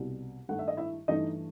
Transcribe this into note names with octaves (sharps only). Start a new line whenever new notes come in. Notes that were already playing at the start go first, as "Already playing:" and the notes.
Already playing: C2 B2 G3
G2 D#3 A3 F#5
E5
D#5
E4 E5
G2 E3 A3 D#4 D#5